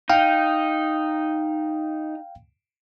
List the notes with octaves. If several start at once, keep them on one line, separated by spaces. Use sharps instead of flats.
D#4 F5 G5